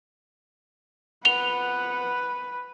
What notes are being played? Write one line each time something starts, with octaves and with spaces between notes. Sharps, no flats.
F2 B3 B4 F#5 F7 G7